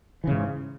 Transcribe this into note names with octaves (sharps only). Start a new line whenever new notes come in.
G#2 C#3 E3